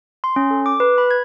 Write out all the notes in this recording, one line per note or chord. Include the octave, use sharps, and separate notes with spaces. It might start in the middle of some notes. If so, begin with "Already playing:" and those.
C6
C#4
A4
D6
B4
B5
G#6